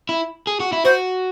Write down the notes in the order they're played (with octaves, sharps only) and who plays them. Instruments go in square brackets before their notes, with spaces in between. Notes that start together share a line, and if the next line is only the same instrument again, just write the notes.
[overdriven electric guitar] E4
G#4
F#4
E4
[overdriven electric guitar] F#4 [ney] C5